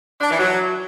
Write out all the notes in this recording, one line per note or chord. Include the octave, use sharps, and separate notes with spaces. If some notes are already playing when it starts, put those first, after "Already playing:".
D4
E3
F#3